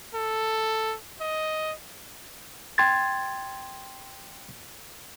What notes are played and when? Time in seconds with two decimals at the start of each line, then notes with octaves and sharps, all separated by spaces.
0.15 A4
1.21 D#5
2.78 G5 C6 G#6 A6